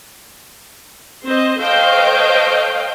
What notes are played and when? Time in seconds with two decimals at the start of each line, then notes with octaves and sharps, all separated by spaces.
1.24 C4 C5 D#5
1.61 A4 C5 C#5 D#5 F5 G5